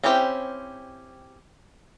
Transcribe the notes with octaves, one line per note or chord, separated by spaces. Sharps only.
C4 C#4 E4 G4 C5